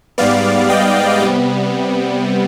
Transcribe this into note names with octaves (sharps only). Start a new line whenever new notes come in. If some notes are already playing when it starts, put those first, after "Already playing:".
G#2 G3 B3 D5 F5
D#5 G5
C3 G3 B3